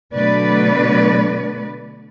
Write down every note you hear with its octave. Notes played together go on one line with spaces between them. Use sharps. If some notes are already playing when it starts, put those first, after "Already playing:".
B2 D3 F#3 A3 B4 D5